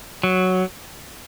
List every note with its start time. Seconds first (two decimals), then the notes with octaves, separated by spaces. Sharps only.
0.23 F#3